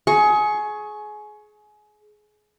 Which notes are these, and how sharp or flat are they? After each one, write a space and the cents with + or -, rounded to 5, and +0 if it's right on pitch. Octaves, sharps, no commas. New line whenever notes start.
G#4 +25 C#6 -5